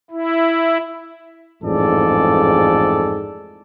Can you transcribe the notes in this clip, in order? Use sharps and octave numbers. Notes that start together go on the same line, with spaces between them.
E4
A1 F2 G#2 G#4 A4 D5